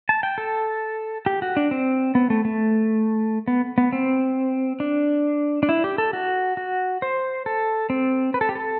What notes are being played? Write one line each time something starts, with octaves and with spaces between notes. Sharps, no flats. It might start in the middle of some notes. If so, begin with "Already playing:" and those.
A5
G5
A4
G4
F#4
D4
C4
B3
A3
A3
B3
B3
C4
D4
D4
E4
G4
A4
F#4
F#4
C5
A4
C4
B4
A4
G4
A4